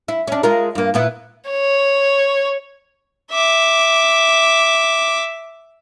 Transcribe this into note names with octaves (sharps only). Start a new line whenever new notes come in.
E4
C#4 D4
G#3 F4 A#4
G2 A#3
A#2 B3 E4
C#5
E5 D6